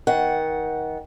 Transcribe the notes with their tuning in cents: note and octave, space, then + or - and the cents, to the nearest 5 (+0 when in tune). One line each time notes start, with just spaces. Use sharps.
D#3 +25 F#5 +0